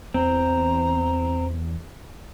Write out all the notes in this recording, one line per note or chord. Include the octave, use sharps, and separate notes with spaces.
E2 C4 A#5